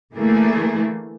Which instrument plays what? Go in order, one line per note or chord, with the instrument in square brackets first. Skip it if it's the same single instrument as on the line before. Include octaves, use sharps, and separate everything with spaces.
[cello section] D3 E3 A3 A#3 E4 G#4